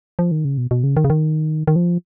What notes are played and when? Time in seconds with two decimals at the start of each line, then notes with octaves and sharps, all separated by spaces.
0.19 F3
0.31 D#3
0.45 C#3
0.58 B2
0.71 B2
0.84 C#3
0.97 D#3
1.04 C#3
1.10 D#3
1.67 D#3
1.76 F3